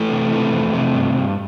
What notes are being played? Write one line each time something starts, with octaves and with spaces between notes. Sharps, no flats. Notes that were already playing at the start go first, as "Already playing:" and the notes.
Already playing: E3 A3
C3
E3
F2
C3
G2
G2